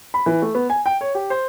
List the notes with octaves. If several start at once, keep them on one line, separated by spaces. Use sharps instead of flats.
B5
E3
A3
B3
G#5
G5
C#5
G4
C5